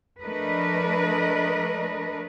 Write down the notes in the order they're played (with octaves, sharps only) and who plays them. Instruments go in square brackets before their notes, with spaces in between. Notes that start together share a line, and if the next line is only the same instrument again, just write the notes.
[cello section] F3 A3 D4 A#4 B4 D#5